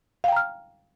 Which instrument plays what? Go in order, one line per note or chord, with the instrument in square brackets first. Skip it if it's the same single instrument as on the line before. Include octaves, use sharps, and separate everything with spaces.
[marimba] F5
G5
A#5
F6